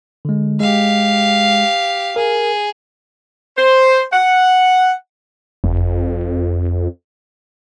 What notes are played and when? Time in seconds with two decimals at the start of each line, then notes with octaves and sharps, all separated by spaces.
0.25 D3 G#3
0.60 G#3 G4 F5
2.16 G#4 A#4
3.57 C5
4.13 F#5
5.64 F#1 F2